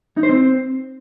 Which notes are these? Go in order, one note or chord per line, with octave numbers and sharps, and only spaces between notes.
D#4
C5
C4